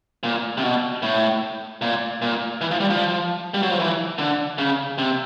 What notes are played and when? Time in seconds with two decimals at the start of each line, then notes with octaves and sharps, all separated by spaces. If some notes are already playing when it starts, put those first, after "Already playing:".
0.23 A#2
0.57 C3
0.63 B2
1.02 A2
1.81 A#2
2.22 A#2
2.61 E3
2.71 F3
2.80 G3
2.90 F3
3.54 G3
3.63 F#3
3.71 F3
3.79 E3
4.18 D3
4.58 C#3
4.98 C3